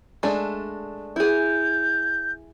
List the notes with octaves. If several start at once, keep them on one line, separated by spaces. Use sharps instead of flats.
G#3 A3 D4
E4 G#4 G6